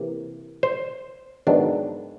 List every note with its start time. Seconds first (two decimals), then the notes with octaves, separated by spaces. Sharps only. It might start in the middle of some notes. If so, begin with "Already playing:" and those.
Already playing: C3 E3 A#3
0.63 C5
1.47 G#2 D#3 F#3 B3 D4